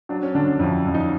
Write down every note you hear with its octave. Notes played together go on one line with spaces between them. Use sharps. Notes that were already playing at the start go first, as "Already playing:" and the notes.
F#3 D4
C#4
D3 D4
D4
F2 E4
F2
D#4